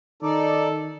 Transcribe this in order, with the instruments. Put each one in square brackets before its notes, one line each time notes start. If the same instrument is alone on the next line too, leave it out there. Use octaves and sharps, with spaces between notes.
[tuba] D#3 [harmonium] D#4 D5 [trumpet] A4